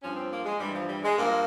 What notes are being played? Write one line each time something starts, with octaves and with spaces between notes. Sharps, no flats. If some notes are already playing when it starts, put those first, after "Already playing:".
G2 F3 C#4
C4
A#3
G#3
G2 E3 G3
F3
G3
G#3
G2 F3 A#3